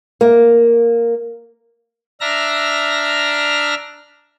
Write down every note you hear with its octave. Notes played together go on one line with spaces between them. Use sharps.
A#3
D4 E5 A#5 F6 A#6